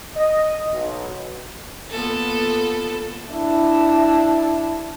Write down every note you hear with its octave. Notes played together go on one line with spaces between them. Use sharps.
D#5
B1
A#3 B3 F4 A4
D4 E4